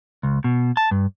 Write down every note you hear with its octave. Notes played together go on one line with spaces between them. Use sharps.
C#2
B2
A5
G2